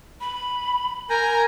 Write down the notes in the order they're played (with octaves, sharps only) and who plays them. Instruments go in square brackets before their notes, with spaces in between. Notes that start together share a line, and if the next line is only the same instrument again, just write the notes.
[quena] B5
[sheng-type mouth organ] A#4 G#5 A#5 [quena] G6